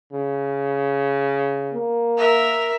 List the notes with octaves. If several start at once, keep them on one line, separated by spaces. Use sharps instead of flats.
C#3
A#3
A#4 E5